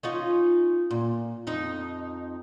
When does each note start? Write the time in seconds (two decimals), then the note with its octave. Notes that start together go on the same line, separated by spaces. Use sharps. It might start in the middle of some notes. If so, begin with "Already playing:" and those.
0.03 C#4 D#4 F4
0.91 A#2
1.47 F2 D#4